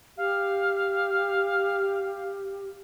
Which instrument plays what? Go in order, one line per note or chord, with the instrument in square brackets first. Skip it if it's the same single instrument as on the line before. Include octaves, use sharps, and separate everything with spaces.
[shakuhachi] G4 [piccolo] F5